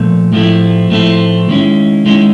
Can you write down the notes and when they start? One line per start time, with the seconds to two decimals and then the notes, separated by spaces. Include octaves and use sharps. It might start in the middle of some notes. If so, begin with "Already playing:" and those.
Already playing: A#2 F3 A3
0.33 A2 F3 A3 C4 E4
0.90 A2 F3 A3 C4 E4
1.49 D#3 G#3 C#4 E4
2.06 D#3 G#3 C#4 E4